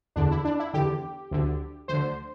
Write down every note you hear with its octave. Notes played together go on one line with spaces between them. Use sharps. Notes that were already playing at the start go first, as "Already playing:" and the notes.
E2 D3 D4
E4
D4
E4
E2 D3 G4
D2 D3
D2 D3 C5